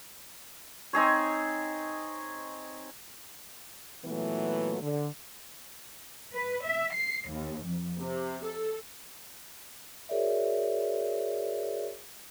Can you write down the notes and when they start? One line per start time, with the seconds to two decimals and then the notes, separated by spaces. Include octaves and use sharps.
0.93 C4 D#4 G#4 C#5
4.05 A#2 E3 F#3 A3 B3
4.81 D3
6.34 B4
6.63 E5
6.93 C7
7.28 D#2
7.66 F2
8.00 C3
8.44 A4
10.09 F#4 G#4 A#4 C#5 D5 E5